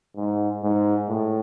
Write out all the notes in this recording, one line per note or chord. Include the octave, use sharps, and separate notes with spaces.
G#2
G#2
A2